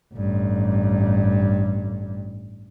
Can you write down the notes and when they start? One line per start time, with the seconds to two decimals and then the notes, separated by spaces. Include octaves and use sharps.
0.14 A1 G2